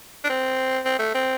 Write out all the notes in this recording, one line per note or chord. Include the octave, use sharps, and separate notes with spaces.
D4
C4
C4
A3
C4